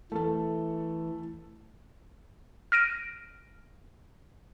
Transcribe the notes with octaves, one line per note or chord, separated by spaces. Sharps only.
E3 A3 A4
F6 A#6 D7 D#7